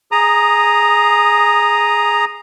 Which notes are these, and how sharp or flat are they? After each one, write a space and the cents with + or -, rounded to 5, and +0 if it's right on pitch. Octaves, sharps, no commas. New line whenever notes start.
G#4 +0 A#5 +0 D#6 -15